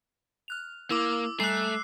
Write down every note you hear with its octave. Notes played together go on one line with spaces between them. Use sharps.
F6 F#6 F7
A#3 E4 D6 E6
G3 A3 G#5 A#5 F#6 C7